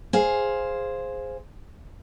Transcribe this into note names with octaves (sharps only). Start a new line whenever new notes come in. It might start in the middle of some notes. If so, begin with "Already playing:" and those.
G#4 C5 F5